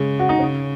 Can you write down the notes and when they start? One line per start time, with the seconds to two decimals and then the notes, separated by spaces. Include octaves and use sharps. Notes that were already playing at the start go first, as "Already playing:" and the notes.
Already playing: C#3 G#3
0.19 F#4
0.29 D#4
0.39 C#3 C#4